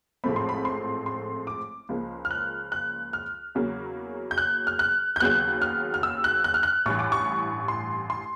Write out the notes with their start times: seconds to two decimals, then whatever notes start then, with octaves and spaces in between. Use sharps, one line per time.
0.24 A1 G#2 F3 A3 C4 B5
0.36 C6
0.49 B5
0.65 C6
1.06 C6
1.47 D6
1.89 C#2 C#3 F3 A#3
2.25 F6
2.31 F#6
2.72 F#6
3.13 F6
3.55 E2 C#3 F#3 A#3 C#4
4.31 G6
4.38 F#6
4.67 F6
4.79 F#6
5.16 G6
5.20 D#2 C#3 F#3 B3 F#6
5.62 F6
5.94 F6
6.03 E6
6.24 F#6
6.44 F#6
6.54 F6
6.63 F#6
6.86 A1 G2 E3 C#6
6.99 D6
7.12 C#6
7.68 C6
8.10 C6